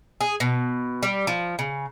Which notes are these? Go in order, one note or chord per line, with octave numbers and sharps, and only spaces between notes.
G#4
B2
G3
F3
C#3